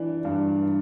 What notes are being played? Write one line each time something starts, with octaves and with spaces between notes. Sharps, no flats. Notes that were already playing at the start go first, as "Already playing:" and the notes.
Already playing: E3 D4
G2